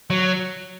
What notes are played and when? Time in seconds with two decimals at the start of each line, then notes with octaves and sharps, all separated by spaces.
0.10 F#3